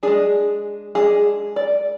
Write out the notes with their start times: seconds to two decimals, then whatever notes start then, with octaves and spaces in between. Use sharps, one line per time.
0.03 G#3 D4 G#4
0.95 G#3 D4 G#4
1.56 D5